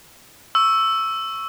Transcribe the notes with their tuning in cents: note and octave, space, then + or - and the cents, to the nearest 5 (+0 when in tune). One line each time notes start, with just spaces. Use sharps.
C#6 +0 E6 +0